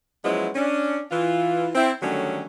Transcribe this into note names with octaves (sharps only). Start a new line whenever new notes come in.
F3 F#3 G#3 B3 C#4 E4
C#4 D4
E3 F4
C4 E4
D3 D#3 F#3 G3 A3 C#4